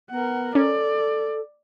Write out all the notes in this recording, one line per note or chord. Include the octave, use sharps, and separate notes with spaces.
B3 A#4 F#5
C#4 A4 D5